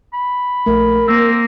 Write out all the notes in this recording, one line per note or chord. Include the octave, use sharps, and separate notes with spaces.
B5
A#1 A3 A#4
A#3 C4 E6